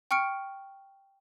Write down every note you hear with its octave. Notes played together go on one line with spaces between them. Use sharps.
G5 C#6 F6 C#7 D7